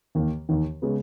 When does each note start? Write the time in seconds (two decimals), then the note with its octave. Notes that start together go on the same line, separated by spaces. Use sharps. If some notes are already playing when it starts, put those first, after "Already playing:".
0.15 D#2 D#3 A#3
0.49 D#2 D#3 A#3
0.82 C#3 G#3 B3